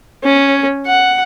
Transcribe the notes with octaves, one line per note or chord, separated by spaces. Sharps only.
C#4
F#5